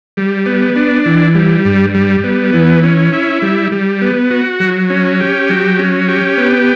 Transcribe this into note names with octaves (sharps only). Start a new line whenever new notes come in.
G3
B3
D4
E3
G3
G2
G3
B3
E3
C#4
E4
G3
G3
B3
F#4
F#3
C#4
G4
F#3
C#4
G4
B3